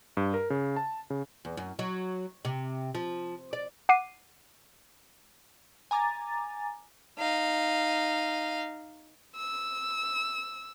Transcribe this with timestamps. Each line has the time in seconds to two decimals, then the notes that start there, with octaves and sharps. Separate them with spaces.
0.17 G2
0.34 A#4
0.50 C#3
0.76 A5
1.10 C#3
1.45 E2
1.57 F#2
1.79 F#3
2.45 C3
2.95 F3
3.53 D5
3.89 F#5 D6 C7 D#7
5.91 G#5 A#5 D6 A6
7.18 D#4 F5
9.36 E6